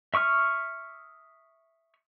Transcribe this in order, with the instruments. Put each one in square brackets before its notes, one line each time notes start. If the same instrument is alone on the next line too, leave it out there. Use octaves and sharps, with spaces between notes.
[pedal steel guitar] E5 C#6 D#6 F6